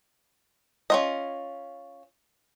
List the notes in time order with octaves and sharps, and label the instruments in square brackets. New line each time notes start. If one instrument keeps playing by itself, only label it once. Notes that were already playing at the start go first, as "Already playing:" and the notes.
[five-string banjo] C#4 F4 D#5